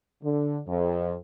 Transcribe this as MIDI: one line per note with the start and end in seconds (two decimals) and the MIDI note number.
0.23 0.59 50
0.67 1.14 41